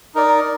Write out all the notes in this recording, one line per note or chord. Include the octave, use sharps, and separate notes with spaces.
D#4 A#4 D5